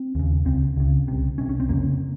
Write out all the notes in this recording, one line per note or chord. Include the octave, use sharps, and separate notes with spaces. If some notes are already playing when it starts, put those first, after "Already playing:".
Already playing: C4
D#2 C#3
C#2 C#3 C4
C#2 C#3
C2 C3
C2 C3 C#4
C#4
C4
F2 C#3 A#3